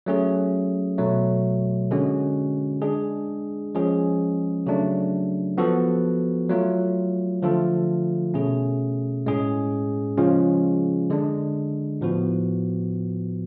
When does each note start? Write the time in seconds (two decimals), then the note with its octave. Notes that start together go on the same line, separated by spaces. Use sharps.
0.06 F#3 A3 C#4 G#4
0.98 B2 F#3 A3
1.91 D3 G#3 C#4 F#4
2.82 G#3 D4 G#4
3.75 F3 G#3 C#4 G#4
4.66 C#3 F#3 A3 D4
5.58 F3 B3 F#4 A4
6.50 F#3 A3 F4
7.42 D3 F3 A3 F4 A4
8.34 B2 A3 C#4 G#4
9.26 A2 G#3 C#4 G#4
10.17 C#3 F3 G#3 C#4 F4
11.10 D3 G#3 D4
12.01 A2 F3 B3 F#4